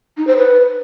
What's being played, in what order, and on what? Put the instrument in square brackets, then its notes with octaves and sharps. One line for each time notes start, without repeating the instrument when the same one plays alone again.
[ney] D#4
C5
B4